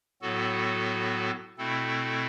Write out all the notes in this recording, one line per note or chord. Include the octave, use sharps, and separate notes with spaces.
A2 F#3 B3 F#4 A4
B2 A3 C4 E4 A4